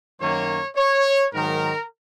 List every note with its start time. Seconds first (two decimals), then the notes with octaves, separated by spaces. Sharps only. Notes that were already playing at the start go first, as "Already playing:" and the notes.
0.21 F#2 D#3 F#3 A#3 C#5
0.76 C#5
1.33 G#2 D#3 F#3 A#4